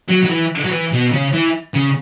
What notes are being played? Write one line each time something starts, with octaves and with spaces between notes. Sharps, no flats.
F#3
F#3
E3
F#3
E3
B2
C#3
E3
C#3